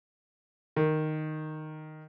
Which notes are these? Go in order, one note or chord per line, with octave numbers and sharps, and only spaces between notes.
D#3